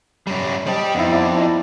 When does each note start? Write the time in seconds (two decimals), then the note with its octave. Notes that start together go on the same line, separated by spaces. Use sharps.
0.27 F#2 G3
0.67 G3 G4 D#5 G5 A5
0.95 F2 B3 D#4 E4
1.12 E4 D5